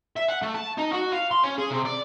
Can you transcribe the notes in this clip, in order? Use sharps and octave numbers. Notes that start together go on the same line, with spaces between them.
E5
F#5
A3
A5
D#4
F#4
F5
C6
C#4
G#4
C3
D5